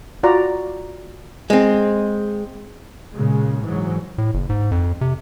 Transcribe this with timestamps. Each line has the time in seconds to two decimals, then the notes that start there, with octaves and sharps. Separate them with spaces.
0.23 F4 F#4 D5 A#5
1.50 G#3 C4
3.13 A#2 C#3 G#3
3.64 G#2 E3 F#3
4.18 A2
4.34 F#1
4.49 G#2
4.71 F2
5.01 C3